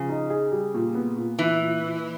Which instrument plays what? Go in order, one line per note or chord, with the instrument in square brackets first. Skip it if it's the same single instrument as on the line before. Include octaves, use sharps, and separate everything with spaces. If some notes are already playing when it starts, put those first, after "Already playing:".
Already playing: [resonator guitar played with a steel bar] C#3 [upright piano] F3
[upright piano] D#4
G#4
G3
A#2
B3
A#2
[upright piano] A#2 [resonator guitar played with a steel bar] E3
[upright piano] A#2
A#2